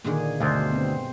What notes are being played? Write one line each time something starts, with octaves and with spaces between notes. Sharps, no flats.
A#2 D3 D#3 A#3 G#4
D2 G2 B2 G#3 C5
B3 C4